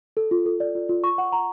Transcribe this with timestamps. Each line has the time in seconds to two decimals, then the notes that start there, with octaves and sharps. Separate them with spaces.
0.17 A4
0.31 F4
0.46 A4
0.60 D5
0.75 F4
0.89 F4
1.04 C#6
1.18 F#5
1.32 A#5